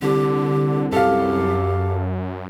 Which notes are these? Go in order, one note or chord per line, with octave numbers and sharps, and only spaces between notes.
C2 D3 G4
F#2 G4 A4 F5